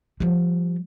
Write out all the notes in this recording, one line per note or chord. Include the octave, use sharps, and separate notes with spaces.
F3 G3